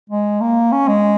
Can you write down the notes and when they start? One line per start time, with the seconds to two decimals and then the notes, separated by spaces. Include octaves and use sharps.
0.10 G#3
0.41 A#3
0.72 C#4
0.88 G#3